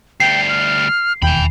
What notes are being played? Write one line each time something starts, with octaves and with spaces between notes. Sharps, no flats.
D2 G3 G5 C7
F6
E1 D#2 G5 G#5 B5